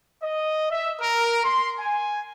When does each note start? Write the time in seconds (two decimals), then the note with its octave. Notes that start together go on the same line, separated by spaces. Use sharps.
0.22 D#5
0.71 E5
1.01 A#4
1.44 C6
1.79 G#5